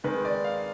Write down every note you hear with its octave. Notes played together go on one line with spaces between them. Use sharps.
D#3 G#3 C4 B4
D5
F5